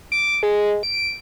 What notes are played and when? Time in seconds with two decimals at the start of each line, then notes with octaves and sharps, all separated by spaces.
0.12 D6
0.43 G#3
0.83 D7